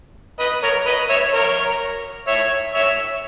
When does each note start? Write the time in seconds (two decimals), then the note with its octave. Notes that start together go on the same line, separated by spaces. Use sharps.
0.39 B4 D#5
0.63 A#4 C#5
0.86 B4 D#5
1.10 C#5 E5
1.33 A#4 C#5
2.27 C#5 E5
2.74 C#5 E5